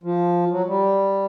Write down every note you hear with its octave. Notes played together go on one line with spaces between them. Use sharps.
F3
F#3
G3